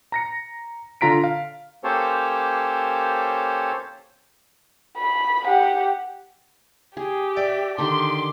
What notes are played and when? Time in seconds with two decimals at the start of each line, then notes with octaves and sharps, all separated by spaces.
0.12 A#5 A#6 C#7
1.01 D3 F4 A#5 B6 D7
1.24 F5
1.84 A#3 C#4 G4 A4 C5 C#5
4.97 B5
5.47 G4 F#5
6.97 G4 G#4
7.37 D5 E5
7.78 D3 D#3 G4 C6 D6